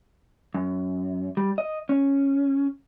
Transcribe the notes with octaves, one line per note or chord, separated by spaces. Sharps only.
F#2
G3
D#5
C#4